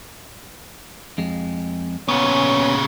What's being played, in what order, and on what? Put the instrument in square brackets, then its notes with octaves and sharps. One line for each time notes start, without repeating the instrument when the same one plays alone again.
[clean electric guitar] F2 G#3
[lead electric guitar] A#2 C#3 [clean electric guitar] B3 [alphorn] C#4